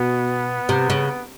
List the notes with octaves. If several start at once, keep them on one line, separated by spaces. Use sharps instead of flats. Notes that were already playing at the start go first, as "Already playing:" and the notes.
Already playing: B2 B3
C3
C#3